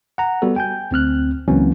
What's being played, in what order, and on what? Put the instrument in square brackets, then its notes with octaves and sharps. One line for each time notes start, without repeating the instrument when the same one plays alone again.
[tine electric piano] F#5 A#5
G3 B3 F#4 A4
G5 G#5 G6
D2 C4 F6 F#6
C#2 E3 F#3 A#3 C4 C#4